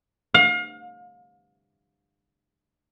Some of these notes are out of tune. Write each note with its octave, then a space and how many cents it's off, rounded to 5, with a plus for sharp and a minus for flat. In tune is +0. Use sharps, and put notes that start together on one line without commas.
F5 +35